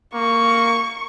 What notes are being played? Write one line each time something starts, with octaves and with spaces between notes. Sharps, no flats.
A#3 C#6